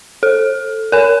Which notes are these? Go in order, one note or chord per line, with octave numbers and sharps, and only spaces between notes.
A4
A#4 G#5